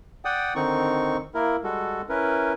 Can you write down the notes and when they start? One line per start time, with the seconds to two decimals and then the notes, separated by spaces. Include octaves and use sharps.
0.25 D5 F#5 G5 D#6
0.55 D3 D#3 C4 D#4 C#6
1.35 A#3 E4 A#4
1.64 G3 G#3 F#4 A4
2.09 C#4 E4 A#4 B4